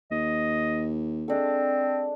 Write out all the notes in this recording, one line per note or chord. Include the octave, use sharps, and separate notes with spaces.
D#2 D#5
G#3 C4 D4 A4